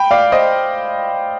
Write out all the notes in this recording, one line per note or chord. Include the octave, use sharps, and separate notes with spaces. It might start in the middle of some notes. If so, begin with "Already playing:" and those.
Already playing: G5 B5
D5 F5
C5 D#5